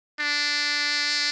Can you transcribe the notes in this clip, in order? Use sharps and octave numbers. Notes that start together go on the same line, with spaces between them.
D4